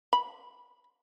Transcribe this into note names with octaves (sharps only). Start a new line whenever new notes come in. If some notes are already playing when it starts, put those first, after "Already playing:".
B5